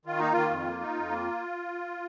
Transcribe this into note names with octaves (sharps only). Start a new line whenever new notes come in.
D#3 F4
A#3 D#4
D#3 F4
F2
A#3
D#4
F2
A#3